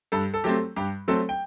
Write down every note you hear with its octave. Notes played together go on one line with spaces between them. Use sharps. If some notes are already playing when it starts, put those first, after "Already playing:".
G2 A4
A4
F#3 A3 C4 G4
G2 G4
F#3 A3 C4 A4
G5